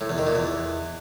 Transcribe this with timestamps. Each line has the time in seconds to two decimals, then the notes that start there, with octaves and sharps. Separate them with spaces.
0.01 A2
0.09 E2
0.18 D#3
0.27 A#2
0.35 E2